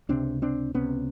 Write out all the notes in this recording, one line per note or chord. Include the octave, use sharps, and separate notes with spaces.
C#2 C3 C4 D4
C4 D4
C#2 C3 B3 C#4